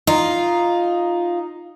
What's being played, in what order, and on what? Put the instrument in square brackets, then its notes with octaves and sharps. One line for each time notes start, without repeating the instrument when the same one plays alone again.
[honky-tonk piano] D#4 [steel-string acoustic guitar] F4